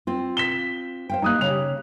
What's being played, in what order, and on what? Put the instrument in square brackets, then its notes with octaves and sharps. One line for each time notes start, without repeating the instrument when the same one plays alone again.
[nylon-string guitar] C4 F4
[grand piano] B6 E7 G7
[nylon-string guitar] C5 F5 G5
[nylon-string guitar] G3 A#3 [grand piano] D#4 D#6 F#6
[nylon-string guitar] C#3 G4 [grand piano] F7